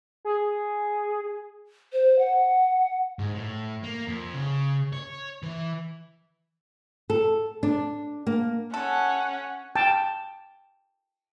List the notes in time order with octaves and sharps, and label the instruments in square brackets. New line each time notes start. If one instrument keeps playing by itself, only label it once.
[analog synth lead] G#4
[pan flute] C5
F#5
[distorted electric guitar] G#2
A2
A#3
F2
C#3
C#5
E3
[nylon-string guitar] A4
D4
A#3
[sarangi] C#4 [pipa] A4 [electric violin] F#5
[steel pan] G5 A5